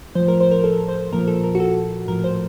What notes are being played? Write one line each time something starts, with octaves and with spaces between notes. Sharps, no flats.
A2 F3 C5
A#4
C5
A#4
A4
C5
A#2 F3 A#4
A4
A#4
F#4
A4
A2 F3 A#4
C5